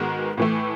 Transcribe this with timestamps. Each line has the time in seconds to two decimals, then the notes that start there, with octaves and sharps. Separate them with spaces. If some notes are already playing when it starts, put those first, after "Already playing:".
Already playing: G#2 D#3 G#3 B3 F#4
0.37 A2 E3 A3